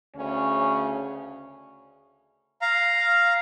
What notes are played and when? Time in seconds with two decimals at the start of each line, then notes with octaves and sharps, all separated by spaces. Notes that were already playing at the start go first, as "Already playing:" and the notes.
0.16 D2 C#3 C#4
2.62 F5 A#5